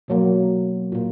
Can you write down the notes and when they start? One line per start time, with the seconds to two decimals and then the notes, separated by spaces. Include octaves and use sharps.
0.08 B2 F#3 A#3
0.92 A#2 A#3